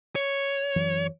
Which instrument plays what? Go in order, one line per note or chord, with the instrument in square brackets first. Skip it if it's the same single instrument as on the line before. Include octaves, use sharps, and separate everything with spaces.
[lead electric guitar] C#5
[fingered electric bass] F#2 E3 F#3